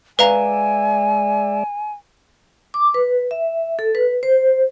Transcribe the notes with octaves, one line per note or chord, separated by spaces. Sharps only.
G#3 B4 D5 E5 F5 G#5 A#5
D6
B4
E5
A4
B4
C5